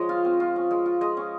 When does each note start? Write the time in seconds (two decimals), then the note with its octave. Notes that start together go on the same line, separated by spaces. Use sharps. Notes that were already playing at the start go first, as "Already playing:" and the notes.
Already playing: F3 G#3 C#5 D#5
0.09 F4 F5
0.25 C4
0.40 F4
0.56 C#4
0.71 G#3
0.86 F4
1.01 G#3 D#5
1.17 C#4